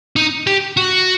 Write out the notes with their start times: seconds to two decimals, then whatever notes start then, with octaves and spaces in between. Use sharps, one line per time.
0.16 D#4
0.47 G4
0.77 F#4